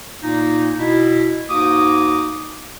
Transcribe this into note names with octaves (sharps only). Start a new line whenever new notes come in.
A#2 A#3 D#4
B2 E4
G#2 A#3 D#4 F#4 D6 D#6